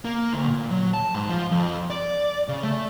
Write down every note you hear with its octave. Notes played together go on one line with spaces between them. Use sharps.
A#3
D2
A#2
F#3
A5
G#2
F3
F2
D5
C#3
A3